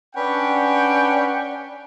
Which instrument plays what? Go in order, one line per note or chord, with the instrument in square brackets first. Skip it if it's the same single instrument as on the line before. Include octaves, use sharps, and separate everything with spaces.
[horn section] C#4 D4 B4 F#5 G5